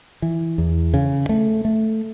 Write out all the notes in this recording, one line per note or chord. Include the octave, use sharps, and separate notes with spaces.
E3
E2
C#3
A3
A3